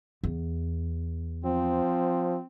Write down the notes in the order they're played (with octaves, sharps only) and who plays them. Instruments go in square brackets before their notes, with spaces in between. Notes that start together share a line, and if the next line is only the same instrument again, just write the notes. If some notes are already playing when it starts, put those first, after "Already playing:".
[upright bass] E2
[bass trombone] F3 [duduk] C4